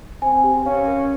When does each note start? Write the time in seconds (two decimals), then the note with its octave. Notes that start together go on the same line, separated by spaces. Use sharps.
0.22 C4 G#5
0.44 G4
0.66 C#4 F5
0.87 A#4